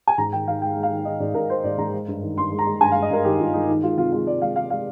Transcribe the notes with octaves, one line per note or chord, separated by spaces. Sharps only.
G#5
G#2 A#5
D#3 G5
D#3 F5
G#3 G5
G#3
F5
D#3
D#3 D#5
G#2 D5
G#2 A#4
G#3 C5
G#2 D5
G#2 A#5
G#3
G2
D#3
G2 C6
G#3
A#5
G#3
G2 G#5
F5
G#3
D#5
G2 A#4
D#3 G4
G2 F4
G#3 D#4
D#3 D#4
G#3 F4
C3 F4
G#3 F4
G#3 D5
G#3 F5
G#3 F5
G#3 F5